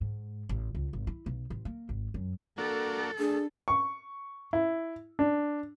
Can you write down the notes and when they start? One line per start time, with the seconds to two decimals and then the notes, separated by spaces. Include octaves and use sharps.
0.01 G#2
0.49 A1
0.75 C#2
0.93 G#1
1.07 E4
1.26 B1
1.50 A1
1.65 A#3
1.89 G#1
2.14 F#2
2.58 A#3 D4 F#4 A4
3.19 A3 D4 G#4
3.68 C#6
4.53 E4
5.19 D4